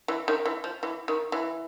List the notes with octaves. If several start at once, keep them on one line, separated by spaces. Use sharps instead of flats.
E3
D#3
E3
F3
E3
D#3
E3